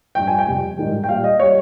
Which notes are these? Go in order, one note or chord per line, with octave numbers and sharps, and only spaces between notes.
G2 F3 G5
G#5
G5
F2 C3 G3
G#2 D#3 G3
G5
A#2 G3 F5
D#5
G3 C#5